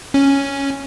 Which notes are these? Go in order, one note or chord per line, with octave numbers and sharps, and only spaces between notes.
C#4